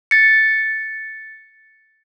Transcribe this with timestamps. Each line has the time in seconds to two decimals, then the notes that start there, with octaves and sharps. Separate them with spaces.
0.11 A6 C#7